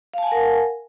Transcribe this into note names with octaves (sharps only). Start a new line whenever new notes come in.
A#4 F5 F#5 G#5 A5